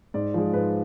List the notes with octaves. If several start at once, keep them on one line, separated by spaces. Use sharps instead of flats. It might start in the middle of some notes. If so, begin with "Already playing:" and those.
G#2 D5
F3 G#3 C5
G#2 B4